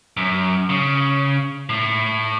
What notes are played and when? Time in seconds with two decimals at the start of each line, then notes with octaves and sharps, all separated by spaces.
0.17 F#2
0.70 C#3
1.69 A2